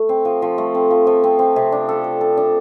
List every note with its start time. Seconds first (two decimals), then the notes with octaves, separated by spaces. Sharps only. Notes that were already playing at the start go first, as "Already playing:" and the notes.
Already playing: A3
0.09 C4
0.25 F3
0.42 F3
0.58 A3
0.74 C4
0.91 F3
1.07 F3
1.24 C4
1.39 C4
1.56 C3
1.72 D4
1.89 A4
2.04 A4
2.21 A4
2.37 D4